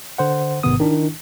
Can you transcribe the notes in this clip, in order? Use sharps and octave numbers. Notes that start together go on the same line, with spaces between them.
D3 C5 F#5
A1 G#2 C3 D#3 B3 D#6
D#3 D4 E4